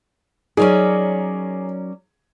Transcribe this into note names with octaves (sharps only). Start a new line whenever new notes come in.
F#3 C#4 D#4 G#4 A#4 D5